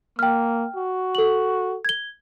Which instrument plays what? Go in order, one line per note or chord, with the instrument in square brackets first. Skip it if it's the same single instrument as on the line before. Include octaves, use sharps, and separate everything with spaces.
[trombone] A#3 [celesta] G5 F6
[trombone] F#4
[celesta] A4 F#7
G#6 G7